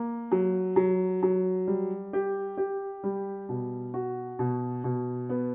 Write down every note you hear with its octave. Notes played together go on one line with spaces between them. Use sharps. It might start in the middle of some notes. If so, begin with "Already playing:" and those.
Already playing: A#3
F#3
F#3
F#3
G3
G4
G4
G3
B2
F#4
B2
B2
B3